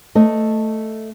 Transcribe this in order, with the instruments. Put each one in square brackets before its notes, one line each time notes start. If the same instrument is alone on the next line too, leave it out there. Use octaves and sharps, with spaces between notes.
[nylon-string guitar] A3 D#5